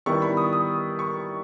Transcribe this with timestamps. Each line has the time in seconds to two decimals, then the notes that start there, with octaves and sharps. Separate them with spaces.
0.06 D#3 G3 B3 E4 C#6
0.22 B5
0.37 D#6
0.53 D#6
0.99 C#6